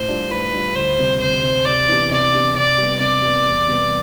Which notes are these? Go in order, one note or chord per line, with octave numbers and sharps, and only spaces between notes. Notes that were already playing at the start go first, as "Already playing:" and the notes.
Already playing: A2 C5
G3 D4 F4
A2 B4
G3 D4 F4
D2 C5
C3 G3
D2 C5
C3 G3
C3 D5
E3 B3 D4 G4
C3 D5
E3 B3 D4 G4
C3 D5
G3 B3
C3 D5
G3 B3
E2
C3 G3 B3